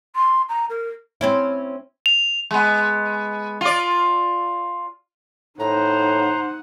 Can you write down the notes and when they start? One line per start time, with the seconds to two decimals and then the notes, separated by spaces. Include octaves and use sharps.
0.15 C6
0.49 A#5
0.70 A#4
1.21 C4 C#4 E4
2.06 F7
2.51 G#3 B3
3.61 F4 D5
5.59 A2 D#4 C5 F#5 A#5